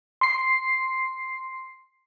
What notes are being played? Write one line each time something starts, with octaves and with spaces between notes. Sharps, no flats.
C6 C7